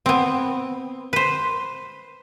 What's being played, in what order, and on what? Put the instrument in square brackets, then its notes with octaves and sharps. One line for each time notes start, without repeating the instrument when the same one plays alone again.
[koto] B3 C4
B4 C5